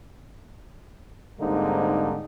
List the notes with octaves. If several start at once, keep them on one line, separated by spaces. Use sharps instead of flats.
G#2 D3 G3 A#3 C4 D#4